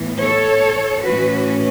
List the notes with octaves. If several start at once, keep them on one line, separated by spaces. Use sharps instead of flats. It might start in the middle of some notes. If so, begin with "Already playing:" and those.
Already playing: A2 E3 B3
A4 C#5
A2 E3 C#4 F#4 B4